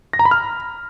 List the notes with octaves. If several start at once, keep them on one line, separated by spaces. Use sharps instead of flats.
A#6
A#5
B5
F6